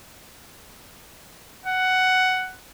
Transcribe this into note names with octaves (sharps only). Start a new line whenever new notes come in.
F#5